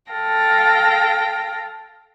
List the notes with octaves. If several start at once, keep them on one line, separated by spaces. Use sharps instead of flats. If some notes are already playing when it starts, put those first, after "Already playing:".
A4 F5 G5 A#6